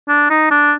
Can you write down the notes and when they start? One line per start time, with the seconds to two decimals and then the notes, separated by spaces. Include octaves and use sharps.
0.08 D4
0.30 D#4
0.51 D4